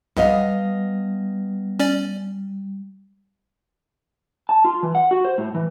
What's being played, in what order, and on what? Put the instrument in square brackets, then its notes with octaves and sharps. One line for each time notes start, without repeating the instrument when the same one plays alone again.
[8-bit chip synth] B1 [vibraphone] G3 [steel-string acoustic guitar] B3 D#5 F5
[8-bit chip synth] C#4 D5
[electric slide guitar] A5
F4
E3
F#5
F#4
C5
A2
E3